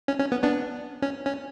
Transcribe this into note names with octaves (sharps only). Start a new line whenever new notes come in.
C#4
C#4
B3
B3 D4
C#4
C#4